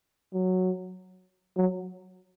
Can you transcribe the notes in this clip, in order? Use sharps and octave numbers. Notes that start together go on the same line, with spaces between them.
F#3
F#3